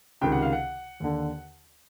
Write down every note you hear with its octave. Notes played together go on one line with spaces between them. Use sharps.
C#2 C3 D#3 G5
F#5
F5
F#5
D#2 D3